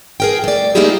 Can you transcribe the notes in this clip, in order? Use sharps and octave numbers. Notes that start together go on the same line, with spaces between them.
G#4 A#4 G5
A3 D5
A3 A#3 D#4 E4 G4 G#4